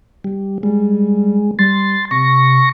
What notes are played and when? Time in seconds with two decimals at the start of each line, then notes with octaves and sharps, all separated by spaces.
0.24 G3
0.63 G3 G#3
1.59 G3 C6 A6
2.11 C3 C#6 A#6